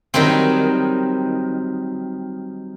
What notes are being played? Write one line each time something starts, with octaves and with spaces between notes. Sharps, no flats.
D#3 F#3 G3 C4